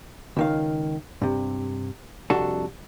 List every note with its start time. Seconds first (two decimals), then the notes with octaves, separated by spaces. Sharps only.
0.37 C#2 D#3 F5
1.22 G2 C3
2.30 C2 F2 D4 F#4 A4